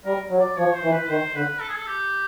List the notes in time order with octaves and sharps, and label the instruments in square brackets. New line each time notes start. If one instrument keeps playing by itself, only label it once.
[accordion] G3 [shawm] A#4
[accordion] F#3
[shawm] D5
[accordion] F3 [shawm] C#5
[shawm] C5
[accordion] E3
[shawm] B4
[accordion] D#3 [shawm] C5
[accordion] D3 [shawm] B4
[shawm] A4
G#4
A4
G4